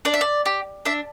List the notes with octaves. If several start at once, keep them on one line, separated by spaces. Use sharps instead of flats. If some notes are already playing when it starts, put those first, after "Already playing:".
D4 D5
E5
D5
G4
D4 E5